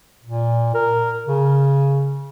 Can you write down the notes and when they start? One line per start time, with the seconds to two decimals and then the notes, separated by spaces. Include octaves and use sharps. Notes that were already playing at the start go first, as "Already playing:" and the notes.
0.24 A#2
0.74 A#4
1.28 C#3